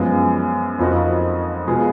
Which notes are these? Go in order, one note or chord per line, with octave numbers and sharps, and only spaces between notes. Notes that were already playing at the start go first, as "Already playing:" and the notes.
Already playing: F#2 F3 G#3 B3
F2 F3 A#3 D#4 F#4
B2 G#3 B3 F4 G#4